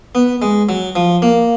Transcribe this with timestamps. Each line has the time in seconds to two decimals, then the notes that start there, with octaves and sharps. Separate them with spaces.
0.15 B3
0.42 G#3
0.69 F#3
0.96 F3
1.22 A#3